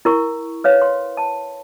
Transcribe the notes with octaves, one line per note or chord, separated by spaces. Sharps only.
E4 A#4 C#6
B4 C#5 F5
C6
A5